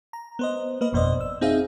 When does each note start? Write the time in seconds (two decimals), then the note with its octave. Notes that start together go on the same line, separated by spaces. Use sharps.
0.13 A#5
0.39 B3 C5 D#5
0.81 A#3 B4 D#5
0.92 G1 F2 B2 C5 D5 D#5
1.21 E6
1.41 C4 D#4 G#4 E5 F5